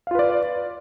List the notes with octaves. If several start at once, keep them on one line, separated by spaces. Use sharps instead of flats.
F4 B4 D5 F5